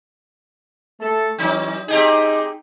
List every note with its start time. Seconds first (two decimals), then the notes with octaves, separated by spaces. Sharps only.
1.00 A3 A4
1.38 E3 F#3 C#4 D#4
1.88 C4 D#4 G4 G#4